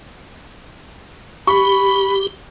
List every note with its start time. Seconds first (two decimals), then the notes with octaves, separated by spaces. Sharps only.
1.47 G4 B5 C#6